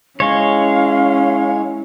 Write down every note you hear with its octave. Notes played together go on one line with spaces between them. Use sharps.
G#3 C#4 E4 C#5 F5